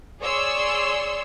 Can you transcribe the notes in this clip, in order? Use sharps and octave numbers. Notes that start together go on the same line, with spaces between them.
G#4 C#5 D5 C6 E6